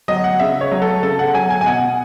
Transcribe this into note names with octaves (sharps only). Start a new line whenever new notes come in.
F#3 D#5
F#5
C#3 E5
C#5
F#3
A4
C#3 A4
F#5
F#3 G#5
G#5
G#5
B2 F#5